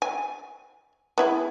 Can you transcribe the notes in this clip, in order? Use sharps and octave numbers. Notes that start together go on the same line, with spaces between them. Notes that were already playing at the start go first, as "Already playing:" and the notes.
G#5
B3 E4 G#4